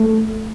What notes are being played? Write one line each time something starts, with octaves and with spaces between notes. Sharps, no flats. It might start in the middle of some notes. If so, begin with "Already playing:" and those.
Already playing: A3